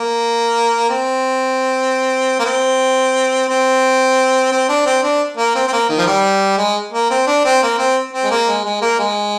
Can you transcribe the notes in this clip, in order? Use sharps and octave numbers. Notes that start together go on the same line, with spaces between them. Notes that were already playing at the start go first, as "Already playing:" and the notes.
Already playing: A#3
C4
A#3
C4
C4
C4
D4
C4
D4
A#3
C4
C4
A#3
D#3
F3
G3
G#3
A#3
C4
D4
C4
A#3
C4
C4
G#3
A#3
G#3
G#3
A#3
G#3